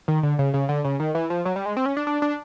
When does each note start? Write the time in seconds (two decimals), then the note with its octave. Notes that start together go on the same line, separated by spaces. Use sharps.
0.08 D#3
0.23 D3
0.39 C#3
0.54 C#3
0.69 D3
0.84 C#3
1.00 D#3
1.15 E3
1.30 F3
1.45 F#3
1.56 G3
1.66 G#3
1.77 C4
1.86 C#4
1.97 D4
2.07 D4
2.22 D4